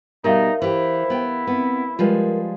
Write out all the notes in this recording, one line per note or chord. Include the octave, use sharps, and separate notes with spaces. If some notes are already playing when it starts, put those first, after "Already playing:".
B2 G3 D#4 A#4 E5 F5
E3 E4 G4 C5
B3 G5
B3 C4
F3 G3 G#3 F4 A#4 B4